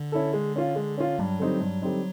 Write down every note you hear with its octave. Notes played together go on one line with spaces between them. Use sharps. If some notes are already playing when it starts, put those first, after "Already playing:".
Already playing: D3
C#4 E4 A4
G#3
C#4 F4
G#3
C#4 F4
G2 F#3
D3 G3 C4 D#4
G2
D3 G3 C4 D#4